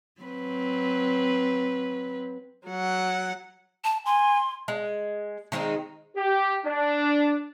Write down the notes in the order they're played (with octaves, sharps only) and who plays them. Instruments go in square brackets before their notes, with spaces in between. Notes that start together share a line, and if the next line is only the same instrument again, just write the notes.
[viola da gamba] F#3 C4 B4
[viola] F#3 F#5
[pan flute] A5
[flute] G#5 [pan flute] C6
[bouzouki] G#3
D#3 G#3 C4 D#4
[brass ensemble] G4
D4